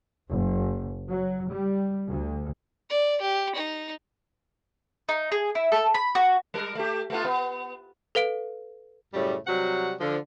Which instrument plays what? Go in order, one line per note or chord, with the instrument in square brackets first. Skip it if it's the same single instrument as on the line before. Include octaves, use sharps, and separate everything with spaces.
[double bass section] F#1
F#3
G3
D2
[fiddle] D5
G4
D#4
[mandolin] D#4
G#4
E4
A4
B5
F#4
[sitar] G3 A#4
A3 G4
A3 B3 F4
B3
[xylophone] A4 B4 F5 D7
[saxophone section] F#2 A2 C#3 G3
C3 F#3 G3 F#4 F#5
D3 F3